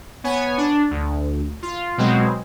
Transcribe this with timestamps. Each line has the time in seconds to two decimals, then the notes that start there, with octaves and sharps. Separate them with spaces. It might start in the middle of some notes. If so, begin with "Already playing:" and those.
0.24 B3 C#5 G#5
0.58 D4
0.91 D2
1.63 F4
1.98 B2 F#3 G#3 C4